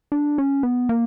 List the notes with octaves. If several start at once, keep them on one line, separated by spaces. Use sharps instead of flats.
D4
C#4
B3
A#3